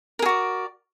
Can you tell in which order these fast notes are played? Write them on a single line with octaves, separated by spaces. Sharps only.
A#4 G#4 F#4 D5